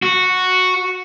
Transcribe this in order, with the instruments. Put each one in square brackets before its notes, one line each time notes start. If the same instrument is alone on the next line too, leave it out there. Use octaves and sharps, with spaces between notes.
[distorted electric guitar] F#4